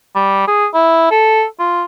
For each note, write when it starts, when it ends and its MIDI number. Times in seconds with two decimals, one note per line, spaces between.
0.15 0.44 55
0.47 0.66 68
0.74 1.07 64
1.11 1.44 69
1.60 1.84 65